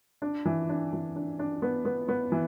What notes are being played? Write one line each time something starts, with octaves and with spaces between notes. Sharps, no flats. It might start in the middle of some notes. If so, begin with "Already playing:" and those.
D4
E3
D4
E3
D4
D4
B3
B3
B3
E3